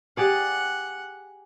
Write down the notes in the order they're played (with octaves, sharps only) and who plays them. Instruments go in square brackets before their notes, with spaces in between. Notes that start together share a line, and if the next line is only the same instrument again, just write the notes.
[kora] G4 G#4 D5 [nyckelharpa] F#5